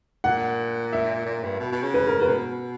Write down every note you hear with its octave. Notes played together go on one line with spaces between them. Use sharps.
A#2 F#5
E5
A#2
G2
B2
B2
C#3
B4
A#4
B4
B2